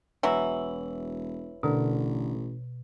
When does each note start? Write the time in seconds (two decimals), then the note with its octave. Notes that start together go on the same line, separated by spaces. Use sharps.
0.23 E1 E3 F#3 E4
1.63 A1 B2 D3 A#4